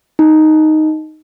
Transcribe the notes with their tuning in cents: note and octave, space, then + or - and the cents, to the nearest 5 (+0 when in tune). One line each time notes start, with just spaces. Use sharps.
D#4 +0